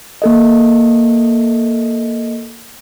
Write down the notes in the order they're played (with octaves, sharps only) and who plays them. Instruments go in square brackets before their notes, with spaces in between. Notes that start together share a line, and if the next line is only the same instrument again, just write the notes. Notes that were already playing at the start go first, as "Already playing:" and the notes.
[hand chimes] A#3 A4 D#5